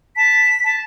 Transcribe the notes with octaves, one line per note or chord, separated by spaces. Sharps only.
A5 B6
A5